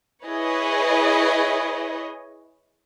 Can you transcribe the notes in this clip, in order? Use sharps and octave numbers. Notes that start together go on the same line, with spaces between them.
E4 G#4 B4 C#5 D#5